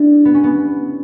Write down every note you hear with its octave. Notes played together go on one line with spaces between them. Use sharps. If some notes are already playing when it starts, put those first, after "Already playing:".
Already playing: D4 E4 G4
B3
C#4
B3